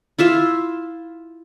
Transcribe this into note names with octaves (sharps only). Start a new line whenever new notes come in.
E4 F4 E5 F5